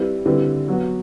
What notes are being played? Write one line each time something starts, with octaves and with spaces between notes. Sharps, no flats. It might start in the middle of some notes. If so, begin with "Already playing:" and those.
Already playing: G3 C4 E4 B4
D3 G3 C4 E4 B4
F#3 B3 F#4